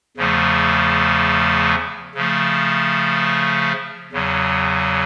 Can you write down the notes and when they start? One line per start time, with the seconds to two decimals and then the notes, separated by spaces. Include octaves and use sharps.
0.17 E2 C#3 F3 A3
2.15 C#3 F3 A3
4.13 E2 C#3 F#3